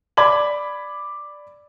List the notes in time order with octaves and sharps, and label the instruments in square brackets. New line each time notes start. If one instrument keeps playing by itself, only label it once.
[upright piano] D5 B5 G#6 F#7